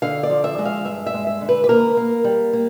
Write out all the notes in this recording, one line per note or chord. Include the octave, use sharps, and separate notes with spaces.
D3 F5
D5
F3
E5
G#3
F5
G2 E5
E5
G#3
E5
D3
B4
B4
A#3 A#4
A#3
G3
A#3